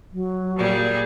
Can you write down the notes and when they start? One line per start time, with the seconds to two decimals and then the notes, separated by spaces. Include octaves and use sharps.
0.12 F#3
0.55 A#2 G3 G#4